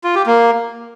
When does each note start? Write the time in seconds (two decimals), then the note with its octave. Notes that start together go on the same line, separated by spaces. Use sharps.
0.04 F4
0.15 G4
0.26 A#3